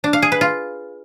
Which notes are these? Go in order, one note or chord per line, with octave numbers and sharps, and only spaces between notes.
D4
F5
G#4
B4
F4